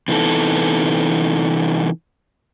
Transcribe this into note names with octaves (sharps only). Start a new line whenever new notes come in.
C3 E3 B3 D#4 A4